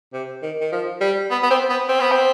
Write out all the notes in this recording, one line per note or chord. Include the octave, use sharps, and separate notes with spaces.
C3
D#3
D#3
F3
G3
B3
B3
C4
B3
C4
B3
C4